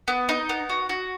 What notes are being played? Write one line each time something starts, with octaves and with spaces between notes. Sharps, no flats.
B3
D#4
B3
F#4
F#4